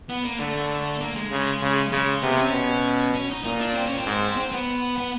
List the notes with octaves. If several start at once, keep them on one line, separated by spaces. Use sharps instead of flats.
B3
A#3
D3 A3
A#3
G#3
C#3
C#3
C#3 G#3
C3 B3
C#4
B2
C#4
D#4
A#2 D#4
D4
C4
C#4
C4
G#2
C4
B3
B3